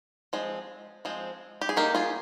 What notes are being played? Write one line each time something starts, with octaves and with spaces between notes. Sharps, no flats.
F3 G#3 C4
F3 G#3 C4
G4
G#4
D#3 A#3 D#4 G4 A#4
F4 G#4